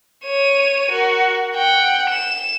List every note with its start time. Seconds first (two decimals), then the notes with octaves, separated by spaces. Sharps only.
0.25 C#5 D#7
0.91 F#4 A#4
1.56 F#5 G5
2.10 E7